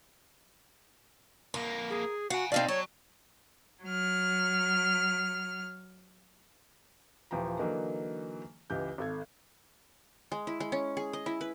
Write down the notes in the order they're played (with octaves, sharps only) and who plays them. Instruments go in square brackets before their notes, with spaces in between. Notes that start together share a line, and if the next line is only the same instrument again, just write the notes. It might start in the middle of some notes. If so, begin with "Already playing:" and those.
[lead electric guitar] F2 A#3 [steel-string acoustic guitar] A#4
[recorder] G#4
[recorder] F#4 [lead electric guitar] F5 G#5 [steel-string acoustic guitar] F#5
[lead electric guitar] B2 [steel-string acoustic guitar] C4 D#4 D5 [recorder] F5
[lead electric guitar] F#3 [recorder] C#5 [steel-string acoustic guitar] A5
[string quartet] F#3 F6
[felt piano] D#1 E3 F3 G5 A#5
D3 E3 F#3 A#3 D#4
C#2 E3 G4 G6
G#1 A4 G#6
[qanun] G#3
E4
G#3
C#4
G#4
D#5
E4
B4